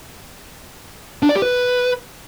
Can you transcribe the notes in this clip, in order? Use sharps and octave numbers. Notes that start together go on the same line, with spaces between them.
D4
D5
G4
B4